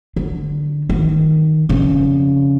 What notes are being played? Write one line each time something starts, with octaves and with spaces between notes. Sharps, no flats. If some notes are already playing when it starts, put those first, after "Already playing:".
D3
D#3
F2 C#3